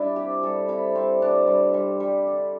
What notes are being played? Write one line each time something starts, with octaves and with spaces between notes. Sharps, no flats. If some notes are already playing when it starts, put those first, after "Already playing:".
Already playing: G3 D4 E4
C3 G4
G3 A4
C3 E4
G3 C4
C3 D4
G3
G3
G3
D3